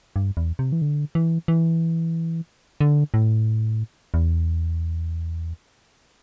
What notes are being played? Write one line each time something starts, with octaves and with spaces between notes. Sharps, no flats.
G2
E2
C3
E3
D3
E3
E3
D3
A2
E2